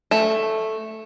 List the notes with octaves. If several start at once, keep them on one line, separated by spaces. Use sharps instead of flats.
A3